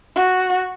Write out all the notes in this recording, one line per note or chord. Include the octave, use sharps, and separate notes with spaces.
F#4